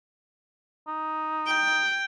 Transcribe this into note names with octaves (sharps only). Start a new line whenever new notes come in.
D#4
G5